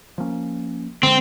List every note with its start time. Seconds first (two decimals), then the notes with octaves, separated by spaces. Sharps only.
0.18 F3 A#3 C#4
1.03 D3 F3 G#3 C4